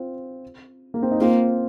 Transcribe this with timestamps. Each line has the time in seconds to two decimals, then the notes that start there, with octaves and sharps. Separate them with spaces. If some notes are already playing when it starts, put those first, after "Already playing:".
Already playing: C4 F4
0.94 A#3
1.02 C4
1.11 D#4
1.20 A#3 C4 F4